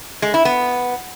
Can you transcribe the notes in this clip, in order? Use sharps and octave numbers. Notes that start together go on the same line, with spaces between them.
G#3
E4
B3